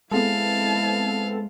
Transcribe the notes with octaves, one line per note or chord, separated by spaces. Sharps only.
G#3 B3 C4 E4 A4 F5 A5